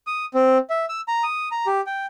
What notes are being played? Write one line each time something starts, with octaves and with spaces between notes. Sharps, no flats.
D#6
C4
E5
E6
A#5
D#6
A#5
G4
G5